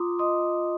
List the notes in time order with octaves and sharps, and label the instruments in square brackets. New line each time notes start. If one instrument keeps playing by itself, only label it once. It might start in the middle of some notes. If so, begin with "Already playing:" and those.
Already playing: [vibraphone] F4 [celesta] A#5 C6 D6 D#6
[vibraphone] D#5 [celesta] C6 D#6